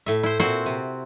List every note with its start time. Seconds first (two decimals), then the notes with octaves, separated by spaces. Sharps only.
0.06 A2 E5
0.23 E4 C5
0.40 A#2 C4 F#4 C5
0.66 C3